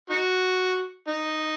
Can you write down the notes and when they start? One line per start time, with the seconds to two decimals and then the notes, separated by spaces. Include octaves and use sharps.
0.10 D#4 F#4
1.08 D#4